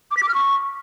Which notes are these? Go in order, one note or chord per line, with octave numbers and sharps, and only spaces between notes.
D6
B6
D6
F6
C#6